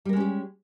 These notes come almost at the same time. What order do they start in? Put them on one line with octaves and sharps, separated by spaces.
G3 A#4 G#3 C#4 G4